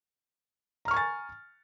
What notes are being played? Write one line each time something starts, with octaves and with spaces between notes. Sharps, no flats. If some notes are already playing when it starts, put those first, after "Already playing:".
G#5 A#5 C#6 F6 A6